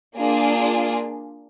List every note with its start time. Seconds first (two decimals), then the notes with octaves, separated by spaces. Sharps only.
0.16 A#3 D4 F4 G#4